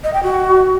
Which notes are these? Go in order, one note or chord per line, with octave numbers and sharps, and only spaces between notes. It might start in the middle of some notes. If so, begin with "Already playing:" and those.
D#5
G5
F#4